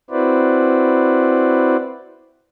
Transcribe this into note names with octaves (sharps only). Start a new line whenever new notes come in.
C4 E4 F#4 B4 C5 D5